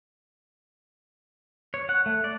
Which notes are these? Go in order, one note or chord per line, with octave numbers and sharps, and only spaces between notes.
C#5
F#5
A3
D5